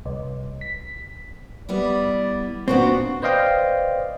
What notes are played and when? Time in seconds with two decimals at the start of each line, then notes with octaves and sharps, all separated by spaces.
0.06 C2
0.61 B6
1.69 G3 B3 E4 D5
2.68 A#2 B3 C4 D4 F#4
3.22 B4 C5 D5 D#5 F5 G5